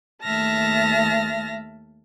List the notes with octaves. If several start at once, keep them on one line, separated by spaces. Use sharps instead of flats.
D#2 A3 E5 A5 F6 A#6